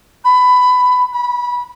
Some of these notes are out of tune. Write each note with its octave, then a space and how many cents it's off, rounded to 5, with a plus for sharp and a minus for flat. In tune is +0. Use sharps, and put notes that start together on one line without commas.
B5 +15
B5 -20